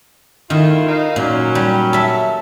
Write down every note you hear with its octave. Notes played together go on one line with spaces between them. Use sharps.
D#3 A3 E4 F4
D#4 F5
A#2 F#3 C#4
G3
A4 E5